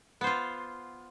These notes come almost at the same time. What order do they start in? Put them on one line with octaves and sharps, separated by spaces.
B3 C5 F4